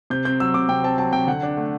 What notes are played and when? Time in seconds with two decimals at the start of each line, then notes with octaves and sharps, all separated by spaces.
0.10 C3 G6
0.25 C4 G6
0.40 F#3 E6
0.54 C3 D6
0.69 C3 G5
0.84 C4 A5
0.98 F#3 A5
1.13 C3 G5
1.27 D3 F#5
1.43 D4
1.57 A3